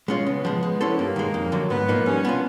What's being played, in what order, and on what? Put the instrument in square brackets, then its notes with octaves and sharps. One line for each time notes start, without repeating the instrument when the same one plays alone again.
[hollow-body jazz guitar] G#3 C#4 F4
[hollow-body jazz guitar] C#3 [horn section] B3
[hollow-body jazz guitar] F3 G#3
G#3
C#4 E4 A4 C5
[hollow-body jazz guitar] G2 [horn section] A#3
[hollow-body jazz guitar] D#3 G#3
F2
D3 F#3
[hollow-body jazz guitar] G#2 [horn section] B3
[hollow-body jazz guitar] F3 A#3 D#4
[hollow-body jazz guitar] G3 [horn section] C#4
[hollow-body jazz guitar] B3 D4 F4